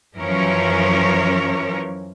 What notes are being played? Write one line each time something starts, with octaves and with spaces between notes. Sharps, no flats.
F#2 E3 F3 C#4 A#4 C#5